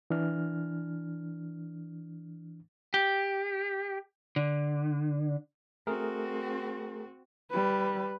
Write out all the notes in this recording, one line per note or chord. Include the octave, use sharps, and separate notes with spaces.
E3 D4 F6
G4
D3
A3 C4 F#4 G#4 A#4
G3 B4